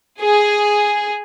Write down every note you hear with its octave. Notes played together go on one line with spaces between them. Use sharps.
G#4